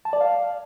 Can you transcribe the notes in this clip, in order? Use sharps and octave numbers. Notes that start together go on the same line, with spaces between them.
A5
D5
F5